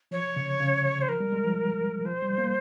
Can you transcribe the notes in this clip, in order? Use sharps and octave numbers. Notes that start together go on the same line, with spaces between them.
F3 C#5
C#3
C#3
C5
F3 A#4
G3
G#3
F3
F3 C5
G3
A#3